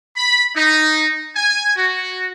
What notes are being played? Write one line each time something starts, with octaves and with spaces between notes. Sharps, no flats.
B5
D#4
G#5
F#4